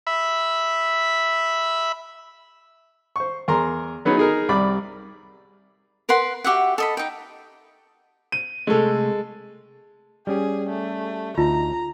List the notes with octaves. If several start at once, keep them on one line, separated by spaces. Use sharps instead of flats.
E5 B5
C5 C#6
E2 A#4 A#5 C6
F#3 B3 C#4 D#4 G#4
D#4 G#4 A#4
C2 G3 D5 B5
A#4 B4 F#5 C6
F#4 G4 E5 F#5
A4 D#5 B5
D#4 G5
D#7
C3 G#3 A3 A4
G3 C#4 G4 G#4
A3
D2 D#4 F4 A5 A#5